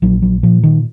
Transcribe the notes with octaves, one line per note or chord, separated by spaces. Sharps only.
A#1 F#3
F#3
A#2 F3
D#3